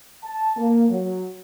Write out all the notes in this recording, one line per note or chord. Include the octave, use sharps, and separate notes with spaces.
A5
A#3
F#3